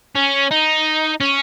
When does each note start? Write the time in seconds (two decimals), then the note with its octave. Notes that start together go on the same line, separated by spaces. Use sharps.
0.15 C#4
0.51 D#4
1.20 C#4